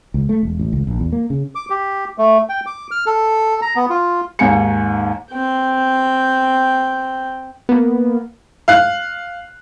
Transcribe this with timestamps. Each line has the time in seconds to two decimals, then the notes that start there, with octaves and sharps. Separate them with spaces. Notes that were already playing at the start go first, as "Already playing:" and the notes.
0.14 C#2
0.29 A3
0.43 E1
0.59 A1
0.73 C#2
0.87 A#1
1.00 E2
1.12 A#3
1.30 C#3
1.55 D6
1.70 G4
2.18 A3
2.49 G5
2.66 D6
2.91 F6
3.06 A4
3.62 A#5
3.76 B3
3.90 F4
4.39 D#2 G#2 G#5 C#7
5.31 C4 G5
7.69 A#3 B3
8.68 F5 F#6